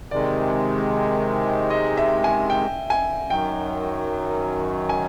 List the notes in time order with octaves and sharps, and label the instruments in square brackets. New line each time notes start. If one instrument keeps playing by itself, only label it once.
[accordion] C3 D#3 G#3 [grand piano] D5
[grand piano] D#5
E5
G#5
G5
G#5
[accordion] F#2 D#3 F#3 [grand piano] G5
[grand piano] G#5